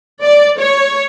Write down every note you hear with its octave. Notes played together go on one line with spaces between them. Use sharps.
D5
C#5